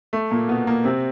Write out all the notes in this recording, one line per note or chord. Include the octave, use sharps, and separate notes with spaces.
A3
A#2 A#3
B2 B3
A#2 A#3
C3 C4